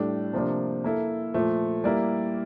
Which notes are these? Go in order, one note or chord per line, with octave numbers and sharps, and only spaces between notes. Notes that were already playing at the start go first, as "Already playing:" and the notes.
Already playing: A2 G3 D4 A4
C3 F3 A#3 D4
A#3 E4 A4
A#2 F3 A3
G3 A#3 E4 A#4 D5